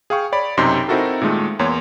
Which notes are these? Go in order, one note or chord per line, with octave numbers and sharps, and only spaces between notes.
G#4 F5 G5 C#6
C#5 D5 B5
B1 F#2 C3 D#4 G4 C6
C4 D#4 E4 F#4 A4 A#4
A#2 D#3 G#3 A3
E2 A#3 C#5 C6